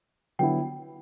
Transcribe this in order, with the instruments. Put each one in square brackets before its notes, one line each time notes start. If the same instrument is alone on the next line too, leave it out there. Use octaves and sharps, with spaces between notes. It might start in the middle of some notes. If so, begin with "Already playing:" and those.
[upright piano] D3 F#3 B3 E4 [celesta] G5